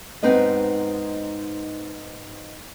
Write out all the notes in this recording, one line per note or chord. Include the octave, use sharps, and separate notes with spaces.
G#2 B3 C4 D#4 B4 D#5